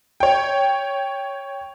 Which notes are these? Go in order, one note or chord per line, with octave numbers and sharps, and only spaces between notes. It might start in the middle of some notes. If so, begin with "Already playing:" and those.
C#5 G5